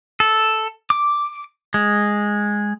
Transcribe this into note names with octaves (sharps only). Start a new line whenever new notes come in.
A4
D6
G#3